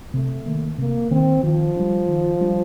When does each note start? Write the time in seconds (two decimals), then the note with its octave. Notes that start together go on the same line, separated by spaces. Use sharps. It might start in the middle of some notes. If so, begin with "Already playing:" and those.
0.14 C3 A3
0.46 D#3 A#3
0.78 C3 A#3
1.11 D#3 A#3 C4
1.43 D#3 F3
1.76 G3 D4
2.09 D#3
2.41 G3 D4